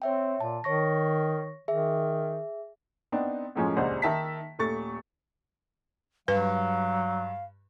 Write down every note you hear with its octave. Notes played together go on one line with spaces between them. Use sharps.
C4 C#5 E5 G5
A#2 A5
D#3 C#5 C#6 A#6
D#3 G#4 E5
B3 C4 D4 D#4
F#2 A2 F3 G#3 C#4
D#1 C#2 D4 C5 D#5 F#5
D#3 E5 A5 B6
D#1 A3 C#6 A6
G2 F#3 B4 F5